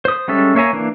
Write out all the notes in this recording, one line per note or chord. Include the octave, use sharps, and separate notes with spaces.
C5 D#6
G3 G#3 C#4 A4 E5
A#3 C#5 E5 G#5 A#5
E3 A#3 D4